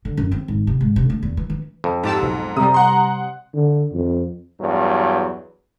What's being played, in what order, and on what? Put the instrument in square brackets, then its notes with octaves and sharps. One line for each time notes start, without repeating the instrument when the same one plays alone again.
[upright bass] D3
F#2
C4
G#1
C3
G#2
C3
A3
E2
E3
E3
[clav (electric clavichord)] F2
[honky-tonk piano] G#2 [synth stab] G4 A5 E6
[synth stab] B1
[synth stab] C3 G3 [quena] A#5 [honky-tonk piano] D#6
[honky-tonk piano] F#5 C6
[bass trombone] D3
F2
[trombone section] E2 G2 F#3